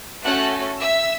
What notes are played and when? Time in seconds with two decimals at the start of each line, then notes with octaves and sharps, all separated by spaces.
0.24 A3 C#4 F#4 A4 F#5 F#6
0.78 E5 E6